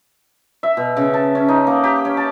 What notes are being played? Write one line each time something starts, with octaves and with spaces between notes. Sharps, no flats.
E5
B2
C#3
A5
C#4
D#4
A#3
G4
C#4
A5